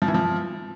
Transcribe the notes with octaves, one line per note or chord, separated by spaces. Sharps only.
F3
E3
F3